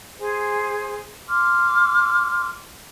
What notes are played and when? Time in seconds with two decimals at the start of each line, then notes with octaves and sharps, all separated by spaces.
0.20 G#4 C5 G#5
1.29 C6 D6 F6